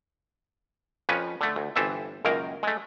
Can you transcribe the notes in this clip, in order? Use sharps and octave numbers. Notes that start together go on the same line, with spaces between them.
F2 F3 C#4 B4
D3 A3
D2
G1 E3 C4 A4 E5
C#2 F#2 D#3 A#3 A#4
G#3 A3